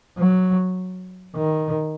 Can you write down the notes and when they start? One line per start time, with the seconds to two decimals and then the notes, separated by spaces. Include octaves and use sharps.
0.18 F#3
1.36 D#3